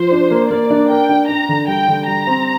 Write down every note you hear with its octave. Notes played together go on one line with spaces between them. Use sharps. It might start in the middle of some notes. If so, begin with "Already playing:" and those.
Already playing: F3 C5
D4
A#3
A#3 D5
D4
A#4 G5
D4
D4 A#5
D3
G3 G5
D3
G3 A#5
C4